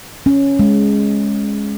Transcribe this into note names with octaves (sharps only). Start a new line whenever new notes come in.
C#4
G#3